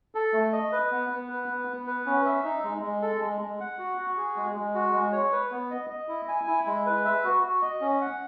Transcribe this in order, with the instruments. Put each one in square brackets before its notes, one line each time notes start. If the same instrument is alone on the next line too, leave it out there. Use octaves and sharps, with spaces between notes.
[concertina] A4
A3
D#5
B4
B3
B3
B4
B3
B3
B4
C#4
E5
D#4
G#3
G#3
A4
G#3
G#3
F#5
F#4
F#4
G#4
G#3
G#3
F#4
G#3
C#5
B4
B3
D#5
D#5
E4
G#5
E4
G#3
B4
E5
F#4
F#4
D#5
C#4
F#5